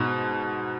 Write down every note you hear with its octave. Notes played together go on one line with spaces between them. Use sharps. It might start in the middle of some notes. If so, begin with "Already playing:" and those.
Already playing: G#2 B2